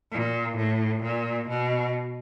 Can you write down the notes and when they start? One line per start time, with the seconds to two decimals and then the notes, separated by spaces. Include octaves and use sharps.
0.12 A#2
0.57 A2
1.03 A#2
1.49 B2